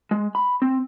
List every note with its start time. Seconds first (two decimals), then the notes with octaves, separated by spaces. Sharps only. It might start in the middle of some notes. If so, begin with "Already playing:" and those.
0.11 G#3
0.35 B5
0.62 C4